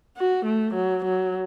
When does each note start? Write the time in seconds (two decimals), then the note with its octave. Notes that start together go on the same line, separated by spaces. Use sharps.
0.17 F#4
0.46 A3
0.75 F#3
1.05 F#3